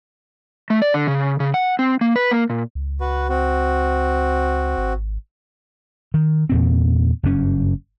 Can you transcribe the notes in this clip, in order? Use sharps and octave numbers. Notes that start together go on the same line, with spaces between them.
A3
D5
D3
C#3
C#3
F#5
C4
A#3
B4
A#3
A#2
C#2
F#4 B4
C4 F#4
G#1
D#3
E2 A#2 C4
F#1 G2 C#4